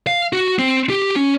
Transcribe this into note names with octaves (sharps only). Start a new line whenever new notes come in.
F5
F#4
C4
G4
C#4